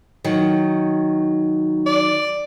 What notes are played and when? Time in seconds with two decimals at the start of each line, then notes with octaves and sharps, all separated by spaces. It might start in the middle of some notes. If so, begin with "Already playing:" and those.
0.24 D#3 F#3
1.86 D5